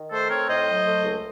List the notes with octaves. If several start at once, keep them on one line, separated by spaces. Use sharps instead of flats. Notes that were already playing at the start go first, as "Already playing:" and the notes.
Already playing: D#3
A3 A4 C5
C4 A#4 C#5
A2 C5 D#5
F#3
A3
C#2